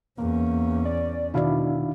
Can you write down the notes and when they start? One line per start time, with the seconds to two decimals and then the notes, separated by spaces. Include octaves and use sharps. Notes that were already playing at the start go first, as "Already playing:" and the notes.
0.18 E2 A#3 C#4
0.85 D5
1.34 B2 D#3 D4 E4 F#4 D5 F5